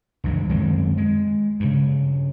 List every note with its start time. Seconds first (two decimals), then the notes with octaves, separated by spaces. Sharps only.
0.24 C#2 G2 E3 G#3
0.49 F#2 D#3 G#3 C4
0.98 G#3
1.60 G2 C#3